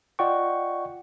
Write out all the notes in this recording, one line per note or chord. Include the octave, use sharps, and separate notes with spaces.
F4 D5 D#5 F#5 G5 C#6